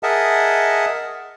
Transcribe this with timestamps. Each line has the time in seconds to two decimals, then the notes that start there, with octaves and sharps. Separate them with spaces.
0.03 G#4 A#4 D#5 E5 F#5 A5